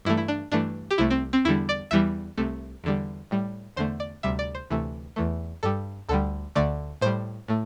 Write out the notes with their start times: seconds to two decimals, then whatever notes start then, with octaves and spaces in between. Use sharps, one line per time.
0.05 G2 E3 A3 E4
0.17 E4
0.28 D4
0.52 G2 E3 A3 D4
0.91 G4
0.98 C2 C3 A3 E4
1.10 C4
1.33 C4
1.45 E2 D3 G3 E4
1.69 D5
1.91 E2 E3 G3 E5
2.38 C2 C3 A3
2.84 E2 D3 G3
3.31 A2 G3
3.76 E2 D3 A3 C5
4.00 D5
4.23 D2 C3 G3 E5
4.39 D5
4.55 C5
4.70 D2 C3 E3 A3
5.16 E2 E3 A3
5.63 G2 G3 A4
6.09 D2 D3 G3 A4
6.55 D2 D3 A3 D5
7.01 A2 G3 C5
7.48 A2 A3